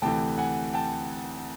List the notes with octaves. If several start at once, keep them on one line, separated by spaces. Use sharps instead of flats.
D2 C3 E3 A3 G5 A5
F#5 G#5
G5 A5